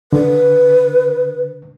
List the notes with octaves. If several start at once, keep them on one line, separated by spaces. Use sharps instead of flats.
D3 B4